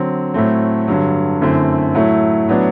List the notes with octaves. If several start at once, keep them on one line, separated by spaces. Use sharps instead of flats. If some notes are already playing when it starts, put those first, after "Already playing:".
Already playing: D3 F#3 C4
A2 F#3 A3 C4
G2 D3 F#3
F#2 D3 A3 C4 E4
A2 F#3 A3 E4
A2 F#3 B3 D4